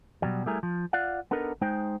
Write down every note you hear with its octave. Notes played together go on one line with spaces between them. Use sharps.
B2 F#3 G3
G3 A3 E4 G#4 A#4
F3
F4 D5 F5 F#5
B3 D4 D#4 A4 A#4
G#3 D#4 C5 G5